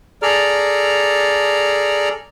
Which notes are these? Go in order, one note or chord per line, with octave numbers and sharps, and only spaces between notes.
G#4 A4 D5 A#5 F6